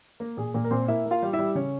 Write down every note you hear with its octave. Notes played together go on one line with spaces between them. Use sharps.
A#3 A#4
A#2 G#4
A#2 A#3 A#4
A#4
A#2 C4 C5
A#3 E4 E5
A#3
F4 F5
G3
E4 E5
G3
C#3 C#4 C#5